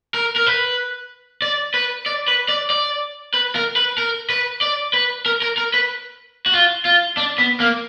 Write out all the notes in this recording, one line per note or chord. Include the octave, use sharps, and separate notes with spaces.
A#4
A#4
B4
D5
B4
D5
B4
D5
D5
B4
A#4
B4
A#4
B4
D5
B4
A#4
A#4
A#4
B4
F#4
F4
F4
D4
B3
A#3